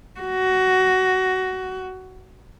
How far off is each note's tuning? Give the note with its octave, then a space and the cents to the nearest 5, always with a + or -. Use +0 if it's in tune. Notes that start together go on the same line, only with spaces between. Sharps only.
F#4 +15